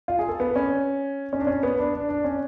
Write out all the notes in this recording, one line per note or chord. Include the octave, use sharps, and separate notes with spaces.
F4
G#4
A4
B3
C#4
C#4
D4
C#4
B3
D4
D4
D4
C#4